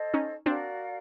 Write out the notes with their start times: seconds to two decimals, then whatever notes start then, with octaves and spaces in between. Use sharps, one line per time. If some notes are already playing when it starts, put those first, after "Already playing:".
Already playing: A4 C5 D#5
0.14 C#4 D#4
0.46 C4 D4 F#4 A#4 D5 F5